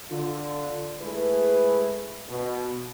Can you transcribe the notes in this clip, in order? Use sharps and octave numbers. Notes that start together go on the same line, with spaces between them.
D3 F4
G#3 A3 E4 G#4 B4
B2